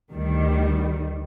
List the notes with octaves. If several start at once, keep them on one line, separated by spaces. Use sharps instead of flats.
D2 D#3 G3